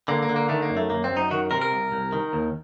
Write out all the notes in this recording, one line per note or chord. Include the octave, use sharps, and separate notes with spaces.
D3 A#3
A#3
D3
A#3
D#3 A3
A#3
F#2
A3
F#2 A#3
C4
F#2
D#4
D#3 F#4
C3 A#4
A#4
C2
C2
D#3
D#2